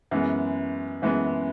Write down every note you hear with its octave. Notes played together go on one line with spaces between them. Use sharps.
F#2 E3 G#3 B3
F#2 E3 G#3 B3